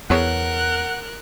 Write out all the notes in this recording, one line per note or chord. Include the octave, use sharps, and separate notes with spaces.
E2 B3 G#4 A#4 C#5 F#5 F#6